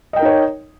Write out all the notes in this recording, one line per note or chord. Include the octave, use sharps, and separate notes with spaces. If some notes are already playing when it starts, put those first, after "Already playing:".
D#4 A#4 C#5 D#5 G5